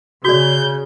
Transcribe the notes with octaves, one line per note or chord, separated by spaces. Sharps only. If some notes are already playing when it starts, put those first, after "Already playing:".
C#3 F#4 D5 G6